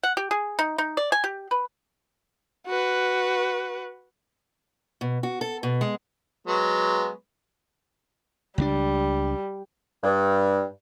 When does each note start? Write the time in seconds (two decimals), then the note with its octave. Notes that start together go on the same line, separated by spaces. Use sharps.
0.03 F#5
0.17 G4
0.31 G#4
0.59 D#4
0.78 D#4
0.97 D5
1.12 G#5
1.24 G4
1.51 B4
2.67 F#4 B4
5.01 B2
5.23 F#4
5.41 A4
5.63 B2
5.81 G#3
6.47 F#3 G#3 B3
8.58 C#2 F3 G3 D4
10.03 G2